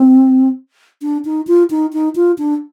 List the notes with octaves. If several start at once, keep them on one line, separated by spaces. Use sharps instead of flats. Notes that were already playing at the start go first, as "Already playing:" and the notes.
Already playing: C4
D4
D#4
F4
D#4
D#4
F4
D4